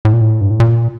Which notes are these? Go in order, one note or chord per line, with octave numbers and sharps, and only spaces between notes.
A2
A#2
A2
G2
A2
A#2